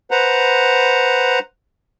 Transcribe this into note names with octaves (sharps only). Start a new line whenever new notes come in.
B4 C5 F#5 A#5